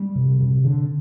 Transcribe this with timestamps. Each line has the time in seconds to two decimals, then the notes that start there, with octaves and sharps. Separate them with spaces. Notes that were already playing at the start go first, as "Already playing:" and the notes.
Already playing: G3
0.15 C3
0.40 C3
0.64 D3